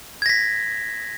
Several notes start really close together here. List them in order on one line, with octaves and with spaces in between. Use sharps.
G#6 A#6 B6